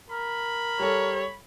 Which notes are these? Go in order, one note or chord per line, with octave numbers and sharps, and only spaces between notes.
A#4 B5
G3 A4 C#5